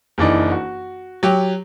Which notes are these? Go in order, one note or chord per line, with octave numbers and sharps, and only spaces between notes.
F#1 E3 D4 D#4
F#4
F#3 G4